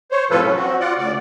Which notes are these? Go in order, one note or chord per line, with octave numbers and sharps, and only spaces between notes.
C5 C#5
A2 C3 F3 F4 A4 B4
F#3 C#4
C4 F#4
F4 D5 F#5
D2 C#3 D5